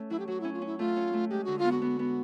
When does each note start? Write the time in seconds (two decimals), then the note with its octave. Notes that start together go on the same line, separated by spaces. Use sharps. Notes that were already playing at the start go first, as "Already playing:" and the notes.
Already playing: A3 C#4
0.10 F#3 E4
0.19 G4
0.27 F#3 F#4
0.41 C#4 E4
0.53 F4
0.62 C#4 E4
0.79 A3 F4
0.96 C#4
1.13 A3
1.30 G#3 G4
1.44 D3 F#4
1.59 F4
1.65 B3
1.72 F#4
1.82 B3
1.99 B3